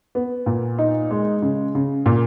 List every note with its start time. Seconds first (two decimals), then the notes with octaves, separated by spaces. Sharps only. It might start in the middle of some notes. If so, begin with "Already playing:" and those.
0.15 B3
0.46 A#2
0.79 D#4
1.11 G#3
1.42 C#3
1.75 C#3
2.06 A#2